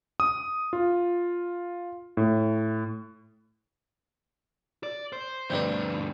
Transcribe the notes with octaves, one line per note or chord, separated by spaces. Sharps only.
D#6
F4
A2
D5
C5
D2 G2 C4 D4 B4